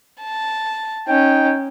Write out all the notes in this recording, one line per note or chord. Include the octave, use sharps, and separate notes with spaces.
A5
C#4 D#4 G5